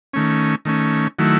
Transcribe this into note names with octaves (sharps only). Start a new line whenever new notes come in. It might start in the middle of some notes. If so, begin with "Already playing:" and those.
D#3 A3 C#4
D#3 A3 C#4
D#3 F#3 A3 E4